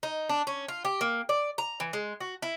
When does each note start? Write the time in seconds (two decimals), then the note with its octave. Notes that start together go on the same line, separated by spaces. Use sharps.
0.03 D#4
0.29 D4
0.47 C#4
0.68 F4
0.85 G4
1.01 A#3
1.29 D5
1.58 A#5
1.80 E3
1.93 G#3
2.20 F#4
2.42 E4